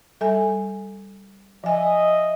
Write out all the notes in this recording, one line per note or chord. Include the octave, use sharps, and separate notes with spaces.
G3 A4 G#5
F3 D#5 E5 G#5